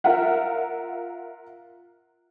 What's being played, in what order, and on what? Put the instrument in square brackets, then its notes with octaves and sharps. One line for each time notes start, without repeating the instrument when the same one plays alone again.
[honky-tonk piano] F4 A#4 E5 F#5